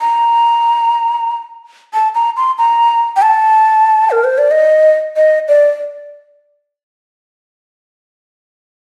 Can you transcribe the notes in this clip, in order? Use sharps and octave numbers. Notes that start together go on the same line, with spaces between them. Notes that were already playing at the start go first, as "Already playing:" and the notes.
A#5
A5
A#5
C6
A#5
G5
A5
A#4
C5
D5
D#5
D#5
D5